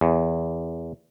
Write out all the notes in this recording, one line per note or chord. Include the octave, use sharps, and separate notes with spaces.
E2